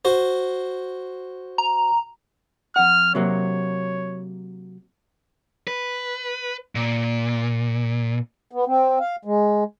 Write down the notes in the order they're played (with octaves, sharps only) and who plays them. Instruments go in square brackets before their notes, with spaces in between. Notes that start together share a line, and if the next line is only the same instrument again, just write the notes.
[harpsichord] F#4 C5
[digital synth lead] A#5
[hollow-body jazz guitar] F2 F#5 [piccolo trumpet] F6
[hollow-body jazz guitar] C3 F#3 A#3 [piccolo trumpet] C#5
[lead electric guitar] B4
A#2
[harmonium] B3
C4
F5
G#3